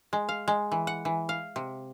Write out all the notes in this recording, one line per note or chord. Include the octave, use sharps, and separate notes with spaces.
G#3
F5
G#3
E3
F#5
E3
F5
C3